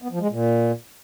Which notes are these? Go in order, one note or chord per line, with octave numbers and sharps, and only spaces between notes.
B3
F3
G#3
A#2